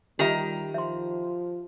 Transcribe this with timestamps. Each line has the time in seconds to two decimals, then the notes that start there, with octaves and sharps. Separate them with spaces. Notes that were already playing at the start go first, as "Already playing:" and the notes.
0.19 D#3 G3 F4 G4 E5 A#5
0.74 F3 E5 C6